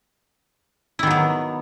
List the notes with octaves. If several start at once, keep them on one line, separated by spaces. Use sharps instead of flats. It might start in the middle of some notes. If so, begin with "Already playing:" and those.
D#3 F#3 B3 E4